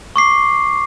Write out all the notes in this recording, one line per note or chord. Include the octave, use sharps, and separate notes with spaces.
C#6 D6 C7